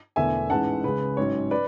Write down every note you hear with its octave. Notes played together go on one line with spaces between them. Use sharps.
E1 E2 D3 A3 E5 G#5
A1 G#2 E3 G#3 F#5 A5
C#2 C#3 G#3 B4
A1 G#2 F#3 C#5
B4 D5